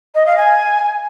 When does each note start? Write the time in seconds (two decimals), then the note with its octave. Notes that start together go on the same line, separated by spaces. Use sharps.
0.15 D#5
0.26 F5
0.37 G#5